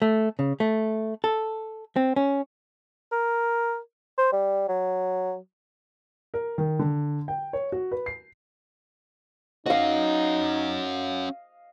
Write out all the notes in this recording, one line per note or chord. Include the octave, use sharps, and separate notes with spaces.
A3
C#3
A3
A4
C4
C#4
A#4
C5
G3
F#3
A#4
D#3
D3
G5
C#5
F#4
B4
C7
C#4 D#4 F#4 D#5 F5